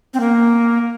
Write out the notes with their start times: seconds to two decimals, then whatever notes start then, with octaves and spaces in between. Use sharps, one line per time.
0.14 C4
0.20 A#3